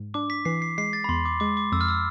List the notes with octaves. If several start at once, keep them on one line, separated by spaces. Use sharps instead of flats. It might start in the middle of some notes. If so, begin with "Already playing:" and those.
Already playing: G#2
D4 D6
B6
E3 C7
C7
G#3 C7
A6
B5
E2 C6
D6
G#3 D6
D6
F2 E6
F6
E6